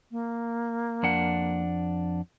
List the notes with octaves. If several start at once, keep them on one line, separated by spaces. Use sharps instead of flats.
A#3
F2 D4 F#5